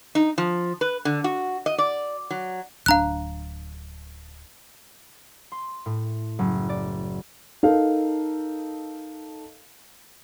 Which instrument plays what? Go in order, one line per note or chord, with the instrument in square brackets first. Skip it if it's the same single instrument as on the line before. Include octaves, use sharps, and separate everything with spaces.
[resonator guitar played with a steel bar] D#4
F3
B4
D3
F#4
D#5
D5
F#3
[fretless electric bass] D1 D4 [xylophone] F5 A#5 F#6
[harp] C6
A2
F#1
D5
[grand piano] D#4 A4 A#4 F5